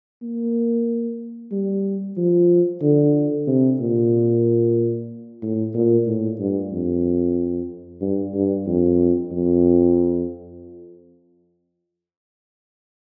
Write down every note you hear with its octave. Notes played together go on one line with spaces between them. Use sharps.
A#3
G3
F3
D3
C3
A#2
A2
A#2
A2
G2
F2
G2
G2
F2
F2